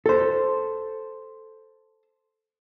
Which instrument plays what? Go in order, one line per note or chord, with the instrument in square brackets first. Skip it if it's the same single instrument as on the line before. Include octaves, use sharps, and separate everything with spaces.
[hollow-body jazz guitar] A4 C5